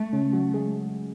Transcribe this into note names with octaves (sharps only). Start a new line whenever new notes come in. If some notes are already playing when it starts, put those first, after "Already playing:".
Already playing: A3
C#3 C#4
F#3 F#4
G#3 G#4